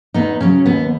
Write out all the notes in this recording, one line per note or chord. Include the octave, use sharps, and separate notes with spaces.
E2 B3 D#4
C#3 F#3 C#4
D#2 B3